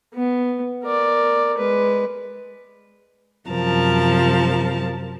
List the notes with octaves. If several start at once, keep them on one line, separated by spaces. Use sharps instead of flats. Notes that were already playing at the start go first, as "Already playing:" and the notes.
B3
A#4 D5
G#3 B4
F#2 C3 F3 A#4 A5